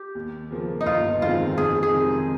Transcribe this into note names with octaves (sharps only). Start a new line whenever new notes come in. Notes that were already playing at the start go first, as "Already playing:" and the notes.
Already playing: G4
D#2
C#3 F3 A#3
D#4
G1 F4
F2 D#3 G#3 C4 F4
F2 G#4
G#4
C3 D#3 G#3 C4